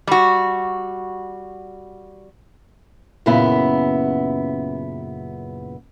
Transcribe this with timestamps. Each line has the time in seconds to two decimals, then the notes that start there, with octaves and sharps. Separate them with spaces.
0.07 G3 F#4
3.26 F#2 A#2 C#3 B3 E4